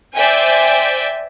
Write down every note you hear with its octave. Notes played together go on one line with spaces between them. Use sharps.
C5 D5 E5 G5 G#5